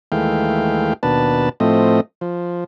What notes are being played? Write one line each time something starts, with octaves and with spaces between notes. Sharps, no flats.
D#2 E3 G#3 A3 F5 G5
D#2 B2 D4 B4 A5
A2 F3 A3 C4 D#5
F3